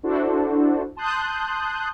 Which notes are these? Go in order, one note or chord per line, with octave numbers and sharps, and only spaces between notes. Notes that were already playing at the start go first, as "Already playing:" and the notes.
D4 E4 F#4 A4 C5
A5 C6 D#6 F#6 G6